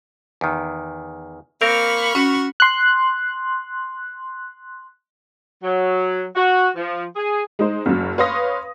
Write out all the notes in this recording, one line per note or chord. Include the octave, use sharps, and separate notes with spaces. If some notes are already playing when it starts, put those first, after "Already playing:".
E2 D#3
A#3 C4 A#4 F5 B5 C#6 F6
C#4 F#4
C6 F#6
F#3
F#4
F3
G#4
G#3 D#4 C5
F#1 F#2
B4 C#5 F5 C6 D#6 A#6